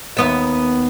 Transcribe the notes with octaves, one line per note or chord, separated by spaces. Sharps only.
D#2 B3 E5